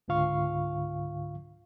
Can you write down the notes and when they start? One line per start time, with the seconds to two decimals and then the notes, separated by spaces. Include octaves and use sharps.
0.08 C#2 G#2 D3 F4 F5 C#6